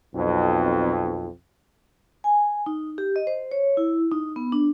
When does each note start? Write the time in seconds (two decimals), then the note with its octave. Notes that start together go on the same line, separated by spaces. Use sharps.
0.14 B1 F2
2.24 G#5
2.66 D#4
2.98 G4
3.16 D#5
3.27 C5
3.52 C#5
3.77 E4
4.11 D#4
4.36 B3
4.52 D4